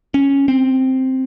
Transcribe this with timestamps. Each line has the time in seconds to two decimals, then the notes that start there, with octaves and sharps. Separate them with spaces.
0.14 C#4
0.48 C4